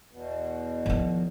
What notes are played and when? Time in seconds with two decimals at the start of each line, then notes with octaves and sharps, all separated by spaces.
0.11 E2 B2
0.86 D#3 F3